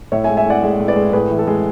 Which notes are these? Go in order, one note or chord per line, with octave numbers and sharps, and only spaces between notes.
A2 C#5 E5
E5 G#5
G#3
E5 G#5
A2 D5 F#5
G#3
A2
B4 D5
G#3
A2 G#4 B4
E3
A4
G#3